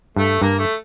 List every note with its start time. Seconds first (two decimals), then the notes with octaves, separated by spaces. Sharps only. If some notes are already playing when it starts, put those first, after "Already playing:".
0.16 G2 A3
0.42 G2 A#3
0.59 A3